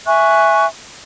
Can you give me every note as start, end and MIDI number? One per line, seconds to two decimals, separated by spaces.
0.06 0.67 76
0.06 0.67 80
0.06 0.67 85
0.06 0.67 90